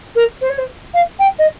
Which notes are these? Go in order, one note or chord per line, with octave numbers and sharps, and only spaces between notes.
A#4
C5
C#5
C5
F5
G5
D#5